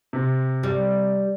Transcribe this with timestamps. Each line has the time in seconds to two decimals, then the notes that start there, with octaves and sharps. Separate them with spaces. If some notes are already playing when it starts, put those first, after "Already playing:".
0.13 C3
0.63 G3